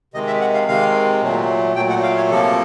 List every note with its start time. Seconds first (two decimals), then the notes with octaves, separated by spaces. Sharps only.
0.14 C3 D#3 G#3 D#5
0.27 E5
0.41 F#5
0.54 F5
0.68 C3 D#3 G#3 F5
1.22 A#2 F#3 A3
1.76 A#2 F#3 A3 G5
1.90 F#5
2.03 F5
2.17 C#5
2.30 C3 F3 A#3 A4